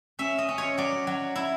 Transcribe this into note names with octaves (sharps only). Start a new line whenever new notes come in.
C#4 E5
D#5
C#4
C#5
F#3 D5
F#3
E4